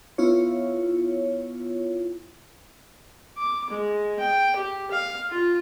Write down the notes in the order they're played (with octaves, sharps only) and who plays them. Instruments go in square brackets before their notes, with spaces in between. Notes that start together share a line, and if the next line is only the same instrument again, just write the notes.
[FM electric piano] B3 E4 F4 C#5
[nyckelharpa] D6
G#3
G5
G4
F5
F4